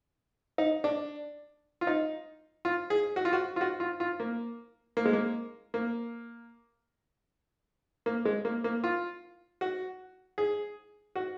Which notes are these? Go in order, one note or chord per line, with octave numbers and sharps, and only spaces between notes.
D#4
D4
F4
D#4
F4
G#4
F#4
F4
F#4
F4
F#4
F4
F4
A#3
A#3
G#3
A#3
A#3
A#3
G#3
A#3
A#3
F4
F#4
G#4
F#4